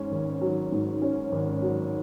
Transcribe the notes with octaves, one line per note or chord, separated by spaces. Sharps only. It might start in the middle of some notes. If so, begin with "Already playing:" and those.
Already playing: G#2 C#4
G#1
F#3
G#2
C#4
G#1
F#3